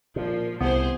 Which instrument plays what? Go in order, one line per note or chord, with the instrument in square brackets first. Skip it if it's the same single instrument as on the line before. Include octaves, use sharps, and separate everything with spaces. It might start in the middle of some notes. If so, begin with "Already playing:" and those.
[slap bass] A#2 [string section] F3
[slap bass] C2 E3 [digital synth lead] B3 [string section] G4 G#4 C5